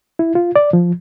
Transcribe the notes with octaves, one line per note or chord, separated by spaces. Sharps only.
E4
F4
D5
F3